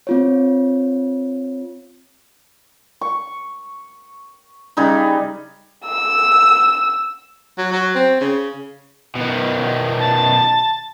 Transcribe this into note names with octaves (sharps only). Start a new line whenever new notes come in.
C4 F4 C#5
C#6
C#3 G3 D#4
E6
F#3
F#3
C4
C#3
B2 D#3
A5